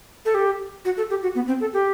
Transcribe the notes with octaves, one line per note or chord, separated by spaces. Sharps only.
A4
G4
F#4
A4
G4
F#4
B3
C4
A4
G4